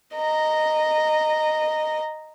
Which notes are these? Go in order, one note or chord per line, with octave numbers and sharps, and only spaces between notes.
D#5 A#5